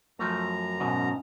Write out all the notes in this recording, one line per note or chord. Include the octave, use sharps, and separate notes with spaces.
F#2 F3 A3 A#5
G#2 B2 C#4